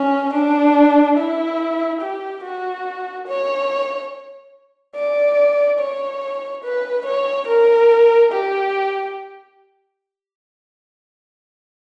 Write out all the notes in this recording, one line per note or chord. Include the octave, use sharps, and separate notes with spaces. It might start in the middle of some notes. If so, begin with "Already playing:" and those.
Already playing: C#4
D4
E4
G4
F#4
C#5
D5
C#5
B4
C#5
A#4
G4